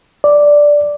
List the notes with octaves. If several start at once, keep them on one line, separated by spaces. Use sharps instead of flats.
D5